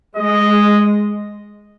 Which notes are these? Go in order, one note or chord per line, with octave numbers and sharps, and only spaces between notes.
G#3 D#5